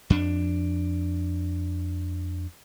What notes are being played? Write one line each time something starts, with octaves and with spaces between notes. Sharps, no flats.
F2 D4